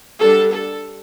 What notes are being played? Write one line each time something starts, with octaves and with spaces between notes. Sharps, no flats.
D3 G3 D4 A4
A4